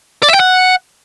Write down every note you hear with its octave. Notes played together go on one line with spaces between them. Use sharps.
D5
E5
G5
F#5